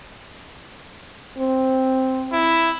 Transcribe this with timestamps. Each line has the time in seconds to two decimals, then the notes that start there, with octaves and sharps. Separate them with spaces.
1.38 C4
2.33 E4